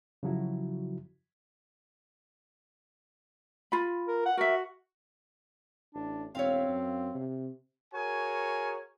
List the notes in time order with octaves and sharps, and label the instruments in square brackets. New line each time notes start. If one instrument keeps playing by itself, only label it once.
[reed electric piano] C#3 F3 F#3 E4 F#4
[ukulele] F4 B5
[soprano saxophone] A#4
F#5
[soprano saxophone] F#4 [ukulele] A#4 E5
[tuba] A1 [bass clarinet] D4
[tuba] E1 [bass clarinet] C4 [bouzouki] C#5 E5 F5
[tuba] F#2
C3
[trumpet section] F#4 G#4 A#4 C#5 G#5